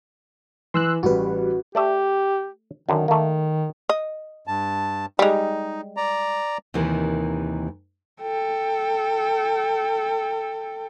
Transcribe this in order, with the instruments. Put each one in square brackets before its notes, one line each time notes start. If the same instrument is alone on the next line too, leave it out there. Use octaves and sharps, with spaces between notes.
[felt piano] E3 [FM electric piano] C6 E6 F#6
[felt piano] A1 G3 [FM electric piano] F#4 B4
[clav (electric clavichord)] A3 D5 E5 [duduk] G4
[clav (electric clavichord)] F#2 D3 [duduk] D#3
[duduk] D#3 [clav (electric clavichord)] A3 A#3
[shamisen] D#5
[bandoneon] G2 A5
[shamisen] G3 G#3 [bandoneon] D#4
[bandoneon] D5 A#5
[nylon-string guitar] D#2 C3 D#3 E3
[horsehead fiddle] A4 G5